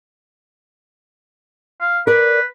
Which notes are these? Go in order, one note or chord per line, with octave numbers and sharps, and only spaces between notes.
F5
A#4 B4 D5